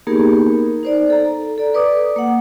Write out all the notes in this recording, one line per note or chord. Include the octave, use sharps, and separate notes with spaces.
A#3 B3 D#4 G4 G#4 A#4
D#4 C5 D5
A4 A#5
A4 D5
B4 D5 D6 D#6
A#3 F#5